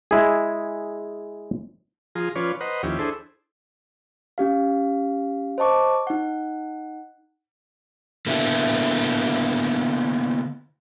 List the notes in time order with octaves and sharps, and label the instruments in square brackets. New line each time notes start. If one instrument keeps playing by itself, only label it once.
[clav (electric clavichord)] G#3 E4 G#4
[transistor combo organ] F3 F4 G#4 A#5
F3 C#4 F4 B4 C#5 D5
B4 C5 D#5 F#5 A#5
D#2 F3 C#4 E4 G4
D4 E4 G#4 A4 C5
[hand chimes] C#4 G4 F5
C5 D#5 A5 C#6 D6
D#4 F#5
[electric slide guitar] D3 A#3 B3 E4